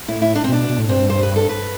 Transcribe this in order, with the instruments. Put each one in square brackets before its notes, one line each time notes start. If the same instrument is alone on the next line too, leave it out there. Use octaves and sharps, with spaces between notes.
[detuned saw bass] A2 [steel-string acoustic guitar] E4
[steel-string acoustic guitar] E4
D4
C4
[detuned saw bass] B2 [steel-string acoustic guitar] D4
[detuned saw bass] B2
A2
[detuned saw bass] G2 [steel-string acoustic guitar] C4
[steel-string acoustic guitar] C5
B4
A4
B4